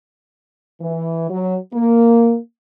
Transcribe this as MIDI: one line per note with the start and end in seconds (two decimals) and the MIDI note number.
0.81 1.27 52
1.30 1.56 54
1.74 2.37 58